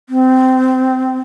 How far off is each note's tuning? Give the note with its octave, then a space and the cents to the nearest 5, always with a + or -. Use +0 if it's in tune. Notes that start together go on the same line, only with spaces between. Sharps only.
C4 -15